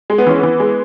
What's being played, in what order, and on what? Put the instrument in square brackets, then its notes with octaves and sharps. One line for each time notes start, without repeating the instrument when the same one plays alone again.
[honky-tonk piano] G#3
[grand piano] B3
[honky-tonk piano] E3 [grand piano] C#4
[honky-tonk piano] E3 [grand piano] B3
[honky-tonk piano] G#3